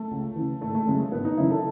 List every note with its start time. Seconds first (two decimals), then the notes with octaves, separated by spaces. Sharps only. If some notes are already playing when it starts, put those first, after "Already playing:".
Already playing: A3
0.11 C#2
0.36 C#3 E3
0.61 G#1 A3
0.75 A3
0.87 F#2 C#3 E3 G#3
1.00 A3
1.12 G#1 B3
1.25 D#4
1.38 F#2 C#3 E3 E4
1.51 A4